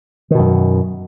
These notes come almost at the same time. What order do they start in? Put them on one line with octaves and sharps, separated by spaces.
D#3 B2 F#2